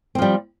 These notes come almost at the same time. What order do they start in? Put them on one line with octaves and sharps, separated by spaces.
C4 F3 G3